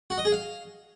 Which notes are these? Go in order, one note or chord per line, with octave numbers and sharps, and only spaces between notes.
F#4
D#5
G#4
F5